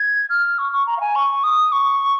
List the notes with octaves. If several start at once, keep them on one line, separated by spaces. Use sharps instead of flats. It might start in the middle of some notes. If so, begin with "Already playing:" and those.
Already playing: G#6
F6
C#6
C#6
A#5
F5
G#5
C#6
D#6
C#6